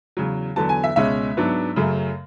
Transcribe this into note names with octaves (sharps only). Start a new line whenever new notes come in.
E2 C#3 F#3
E2 D3 F#3 B3 A5
G#5
E5
C#2 B2 G#3 C#4 E5
G#2 F#3 B3 D4
F#2 C#3 F#3 A3